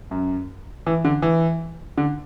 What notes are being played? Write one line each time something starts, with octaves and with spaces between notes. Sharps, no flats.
F#2
E3
D3
E3
D3